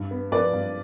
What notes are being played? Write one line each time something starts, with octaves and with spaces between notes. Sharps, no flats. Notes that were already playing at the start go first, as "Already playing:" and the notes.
Already playing: G2
B3
F3 B4 D5
G2